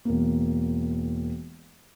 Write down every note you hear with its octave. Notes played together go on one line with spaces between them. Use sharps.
E1 A#3